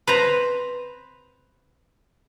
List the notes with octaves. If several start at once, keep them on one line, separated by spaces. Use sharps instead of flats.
B4 C5 A#5